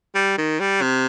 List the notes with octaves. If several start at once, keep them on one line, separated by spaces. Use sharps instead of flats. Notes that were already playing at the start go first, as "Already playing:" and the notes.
G3
D#3
G3
C3